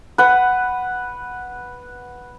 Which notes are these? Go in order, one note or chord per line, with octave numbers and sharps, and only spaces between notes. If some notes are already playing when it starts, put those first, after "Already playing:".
B4 F#5